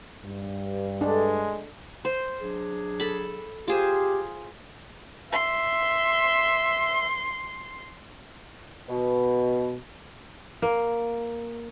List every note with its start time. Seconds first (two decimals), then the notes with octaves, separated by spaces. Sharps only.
0.25 G2
1.01 G#3 A3 D4
2.05 C5
2.41 F#3 D4 G#4
3.00 A4 B5
3.68 F4 G4 G#4 C5
5.32 E5 C6
8.89 B2
10.62 A#3